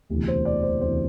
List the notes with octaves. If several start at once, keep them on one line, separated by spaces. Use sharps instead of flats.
E1 D2 C3 E3
C5
D5
C5
E1 D2 C3 E3 C5